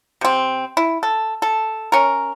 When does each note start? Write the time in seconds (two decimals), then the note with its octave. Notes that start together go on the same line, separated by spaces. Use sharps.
0.21 C3 C4
0.77 E4
1.03 A4
1.42 A4
1.92 C#4 A#4